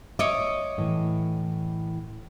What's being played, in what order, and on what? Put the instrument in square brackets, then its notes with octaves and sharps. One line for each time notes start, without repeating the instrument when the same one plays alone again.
[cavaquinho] C#5 D#5 D6 [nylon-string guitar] E5
[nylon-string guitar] A2 E3